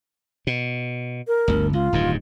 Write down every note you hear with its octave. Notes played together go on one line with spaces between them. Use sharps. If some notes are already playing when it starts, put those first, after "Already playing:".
B2
A#4
G1 D2
C#2 F4
D1 G2 D#3